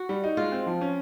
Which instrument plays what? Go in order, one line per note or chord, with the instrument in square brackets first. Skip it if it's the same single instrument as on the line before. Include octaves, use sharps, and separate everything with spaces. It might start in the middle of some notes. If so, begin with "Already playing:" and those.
Already playing: [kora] F#4
[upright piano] G3
D#4
[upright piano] G#3 [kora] F4
[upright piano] C4
F3
C#4